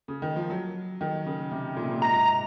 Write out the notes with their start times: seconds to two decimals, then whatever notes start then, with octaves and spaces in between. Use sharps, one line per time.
0.08 C#3
0.22 D#3
0.36 F3
0.50 F#3
1.01 D#3
1.26 C#3
1.52 C3
1.76 A#2
1.84 C3
1.91 A#2
2.02 G#2 A#5